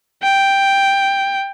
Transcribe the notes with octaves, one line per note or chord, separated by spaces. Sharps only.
G5